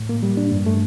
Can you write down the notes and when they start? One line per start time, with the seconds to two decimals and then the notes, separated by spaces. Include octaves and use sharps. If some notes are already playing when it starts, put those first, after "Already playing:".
Already playing: A2
0.09 A#3
0.23 G3
0.37 D4
0.52 G2
0.66 A3